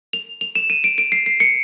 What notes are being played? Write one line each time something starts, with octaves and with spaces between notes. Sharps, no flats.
F7
F7
E7
D#7
D7
D7
C7
C7
C#7